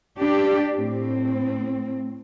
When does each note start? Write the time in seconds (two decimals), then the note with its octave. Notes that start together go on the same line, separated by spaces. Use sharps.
0.18 D4 G4 D5
0.73 A2 C4